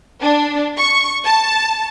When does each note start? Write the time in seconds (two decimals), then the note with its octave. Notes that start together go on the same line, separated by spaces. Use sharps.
0.21 D4
0.77 C#6
1.25 A5